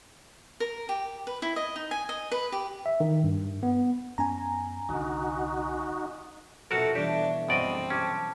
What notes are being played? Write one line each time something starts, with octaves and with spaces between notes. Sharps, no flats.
A#4
G4
B4
E4
D#5
D#4
G#5
D#5
B4
G4
E5
D#3
G2
B3
F#2 B3 C#4 G#5 A#5
C2 D3 D#4 F#4
F1 B2 F4 F#4 A4 A#4
E3 G3 D4 G4 C#5
A#1 F#2 B2 C4 D5 D#5
C#4 G4 A5 D6